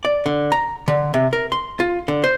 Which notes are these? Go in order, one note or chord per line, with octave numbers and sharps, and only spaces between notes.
D5
D3
A#5
D3
C3
A#4
C6
F4
D3
C5